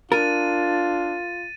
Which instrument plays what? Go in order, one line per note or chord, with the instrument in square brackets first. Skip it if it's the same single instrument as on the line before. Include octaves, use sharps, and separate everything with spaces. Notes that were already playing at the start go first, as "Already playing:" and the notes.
[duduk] D4 [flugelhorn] F4 [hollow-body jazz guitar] A#4 [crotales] A6 D#7